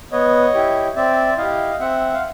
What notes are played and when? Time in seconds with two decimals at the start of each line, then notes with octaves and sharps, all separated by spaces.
0.12 B3 C#5 D#5
0.54 E4 G4
0.96 C4 D5 E5
1.38 E4 G4 D#5 F5
1.79 C4 E5 F#5
2.14 F5